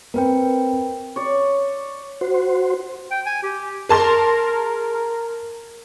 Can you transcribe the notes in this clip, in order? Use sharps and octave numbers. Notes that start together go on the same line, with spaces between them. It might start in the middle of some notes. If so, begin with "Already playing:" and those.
C4 A#4 B4 G5
C#5 D5
F#4 C5
G5
G#5
G4
G#4 A#4 A5 C6